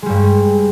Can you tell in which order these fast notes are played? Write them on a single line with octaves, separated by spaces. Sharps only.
G#3 G3 G2